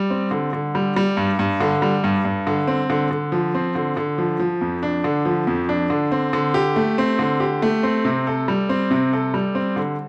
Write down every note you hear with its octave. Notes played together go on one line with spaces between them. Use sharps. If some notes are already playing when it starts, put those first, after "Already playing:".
Already playing: G3
C4
D3
D3
G3
G3
G2
G2
D3
G3
G2
G2
D3
C4
D3
D3
F3
C4
D3
D3
F3
F3
F2
D4
D3
F3
F2
D4
D3
C4
D3
G4
A3
C4
D3
G4
A3
C4
C3
A4
G3
C4
C3
A4
G3
C4
D3